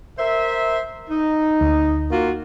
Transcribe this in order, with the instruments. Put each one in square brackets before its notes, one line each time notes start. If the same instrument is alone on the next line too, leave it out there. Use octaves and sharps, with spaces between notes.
[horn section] A#4 C5 E5
D#4
[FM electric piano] D2
[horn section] A#3 F4 F#4